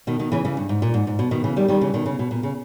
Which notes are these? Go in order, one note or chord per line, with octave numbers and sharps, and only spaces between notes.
B2 D#3
B2 D#3
C#3 E3
C#3 E3
G2
G#2
A#2
G#2
G#2
B2
B2 D#3
C#3 E3
D#3 G3
D#3 G3
C#3 E3
B2 D#3
C#3
B2
A#2
C#3